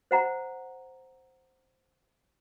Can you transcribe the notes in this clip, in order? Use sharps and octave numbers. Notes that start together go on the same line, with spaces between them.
C5 F#5 A#5